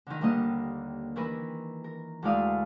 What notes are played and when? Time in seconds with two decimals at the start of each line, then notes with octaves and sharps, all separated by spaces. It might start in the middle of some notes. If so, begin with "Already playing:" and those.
0.07 D3 D#3
0.21 D#2 D3 G3 A#3 D#5
1.16 D#3 E3 E4 A#4 B4
1.84 A#4
2.22 D2 G#3 E4 D5 F5 D#6